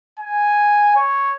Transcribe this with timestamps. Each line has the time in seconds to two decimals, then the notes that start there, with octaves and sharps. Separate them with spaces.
0.19 G#5
0.96 C#5